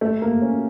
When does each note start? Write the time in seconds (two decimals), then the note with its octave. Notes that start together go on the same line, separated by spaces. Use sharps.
0.01 A3
0.22 A#3
0.42 C#4